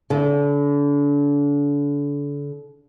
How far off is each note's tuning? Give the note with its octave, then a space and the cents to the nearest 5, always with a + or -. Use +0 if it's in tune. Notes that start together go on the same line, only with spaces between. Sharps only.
D3 -35